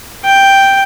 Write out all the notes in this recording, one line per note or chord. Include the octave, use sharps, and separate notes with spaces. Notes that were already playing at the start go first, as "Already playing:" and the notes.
G5